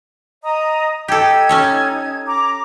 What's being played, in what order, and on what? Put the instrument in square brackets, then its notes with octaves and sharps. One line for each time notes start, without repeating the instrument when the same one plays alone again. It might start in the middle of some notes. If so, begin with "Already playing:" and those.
[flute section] D#5 A#5 D#6
[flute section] D#4 G#6 [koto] G4 A4
[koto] C#4 A4 C#5
[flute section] A#5 D6